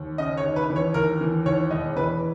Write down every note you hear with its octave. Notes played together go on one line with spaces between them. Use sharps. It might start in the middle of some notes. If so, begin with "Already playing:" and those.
Already playing: D#2
C#3 D#5
C#5
D#2
B4
E3
C#5
D#2 A#4
E3
D#2 C#5
E1 D#5
E3 B4